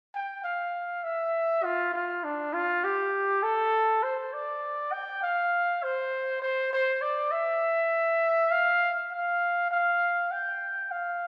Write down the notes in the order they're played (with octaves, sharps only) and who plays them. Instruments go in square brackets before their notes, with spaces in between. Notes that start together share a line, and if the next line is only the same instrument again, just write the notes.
[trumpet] G5
F5
E5
F4
F4
D4
F4
G4
A4
C5
D5
G5
F5
C5
C5
C5
D5
E5
F5
F5
F5
G5
F5